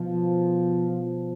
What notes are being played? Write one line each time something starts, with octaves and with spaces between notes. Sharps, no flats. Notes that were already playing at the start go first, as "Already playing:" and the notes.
Already playing: B2 F3
F3